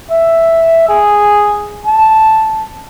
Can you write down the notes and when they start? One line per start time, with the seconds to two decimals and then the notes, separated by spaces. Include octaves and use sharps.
0.10 E5
0.88 G#4
1.86 A5